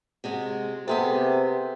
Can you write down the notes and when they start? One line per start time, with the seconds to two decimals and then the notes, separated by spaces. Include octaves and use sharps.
0.24 C3 G#3 F#4
0.88 C3 B3 G#4 A4